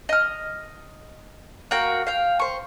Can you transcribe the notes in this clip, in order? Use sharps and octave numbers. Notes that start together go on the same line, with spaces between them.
D#5 F6
A#3 F#4 G5
F5 G5
C5 C#6